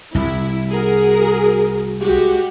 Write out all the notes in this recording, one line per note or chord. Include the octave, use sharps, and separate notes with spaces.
C2 E4
F#4 G#4 A#4
G#3 F#4 G4